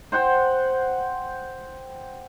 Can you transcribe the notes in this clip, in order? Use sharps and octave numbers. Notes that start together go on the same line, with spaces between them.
C5 F#5 G5 C6